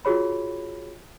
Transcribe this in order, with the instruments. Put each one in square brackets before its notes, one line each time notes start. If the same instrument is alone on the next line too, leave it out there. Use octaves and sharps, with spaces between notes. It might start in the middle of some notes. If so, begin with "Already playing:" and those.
[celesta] F4 F#4 G#4 C#5 B5